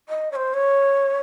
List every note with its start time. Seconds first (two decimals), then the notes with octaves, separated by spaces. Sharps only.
0.09 D#5
0.32 C#5
0.36 C5
0.54 C#5